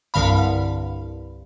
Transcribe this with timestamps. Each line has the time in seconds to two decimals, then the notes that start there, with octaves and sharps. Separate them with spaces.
0.14 C2 G2 D3 F5 B5